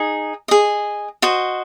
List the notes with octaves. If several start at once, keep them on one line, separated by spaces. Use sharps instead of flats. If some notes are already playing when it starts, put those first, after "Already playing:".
Already playing: D#4 G#4
G#4 D#5
F#4 C5 D#5